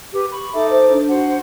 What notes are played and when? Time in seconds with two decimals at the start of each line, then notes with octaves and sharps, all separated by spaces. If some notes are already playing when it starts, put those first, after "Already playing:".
0.13 G4 B4
0.32 B5 C#6
0.54 D#4 A4 E5 D6
0.70 C5
0.91 D4
1.09 F#4 C5 F#5